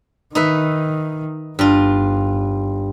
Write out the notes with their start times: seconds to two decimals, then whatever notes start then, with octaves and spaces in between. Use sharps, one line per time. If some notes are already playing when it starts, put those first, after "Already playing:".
0.35 D#3 D#4 B4 E5
1.59 G1 G2 F4